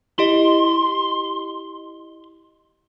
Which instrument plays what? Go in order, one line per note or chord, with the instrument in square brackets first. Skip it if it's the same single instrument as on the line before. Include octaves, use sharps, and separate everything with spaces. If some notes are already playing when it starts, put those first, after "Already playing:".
[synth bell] E4 G4 D#5 [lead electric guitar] C6